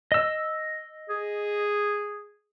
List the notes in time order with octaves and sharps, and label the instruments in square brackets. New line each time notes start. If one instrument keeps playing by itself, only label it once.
[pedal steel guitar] D#5 E6
[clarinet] G#4